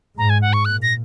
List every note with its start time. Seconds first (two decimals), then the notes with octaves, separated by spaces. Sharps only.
0.17 G#2 A#5
0.30 G#5
0.42 F#5
0.53 C#6
0.65 A#2 F#6
0.82 A#6